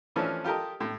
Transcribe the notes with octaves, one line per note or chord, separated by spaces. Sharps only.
E3 F3 A3 C#4 D4 F4
F4 G4 A4 A#4 D#5
A2